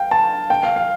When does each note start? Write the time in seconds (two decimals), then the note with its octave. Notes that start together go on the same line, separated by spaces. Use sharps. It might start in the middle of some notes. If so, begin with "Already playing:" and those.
Already playing: F5 G5
0.11 A5
0.50 G5
0.63 F5
0.76 F5